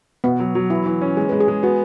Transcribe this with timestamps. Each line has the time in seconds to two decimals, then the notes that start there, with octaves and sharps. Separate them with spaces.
0.24 B2 B3
0.40 F#3
0.55 F#3
0.70 E3 E4
0.86 E3
1.01 C#4
1.17 G#3 G#4
1.29 G#3 B4
1.40 G#4
1.48 G#3
1.63 B3 F#4